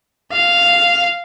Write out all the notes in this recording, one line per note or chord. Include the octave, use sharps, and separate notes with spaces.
F5